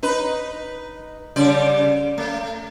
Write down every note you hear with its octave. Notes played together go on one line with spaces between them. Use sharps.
D#4 B4
C#3 G3 D5
A3